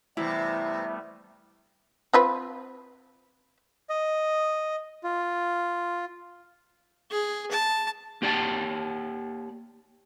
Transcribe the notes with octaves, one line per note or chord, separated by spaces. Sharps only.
C3 E3 G3 A3 B3 E4
C4 F4 B4
D#5
F4
G#4
A5
A#3 G4 D5 G#5 A5